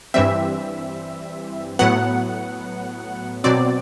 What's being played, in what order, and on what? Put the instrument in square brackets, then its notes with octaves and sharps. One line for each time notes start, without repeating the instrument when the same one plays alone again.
[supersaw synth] G2 E3 G3 C4 E5
A2 F#3 B3 F#5
B2 F#3 C4 D5